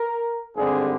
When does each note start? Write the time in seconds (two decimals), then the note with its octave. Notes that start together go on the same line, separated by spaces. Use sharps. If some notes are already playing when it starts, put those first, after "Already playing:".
Already playing: A#4
0.55 G#1 G2 D3 G3 C4 G#4